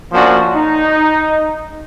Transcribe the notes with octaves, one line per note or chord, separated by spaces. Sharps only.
F3 A#3 C#4 D4 F#4
D#4